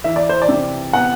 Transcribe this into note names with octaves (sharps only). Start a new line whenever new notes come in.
E3 E5
D5
C5
D5
C3
B3 F#5